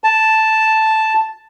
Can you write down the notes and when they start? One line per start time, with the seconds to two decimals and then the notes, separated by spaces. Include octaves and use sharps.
0.04 A5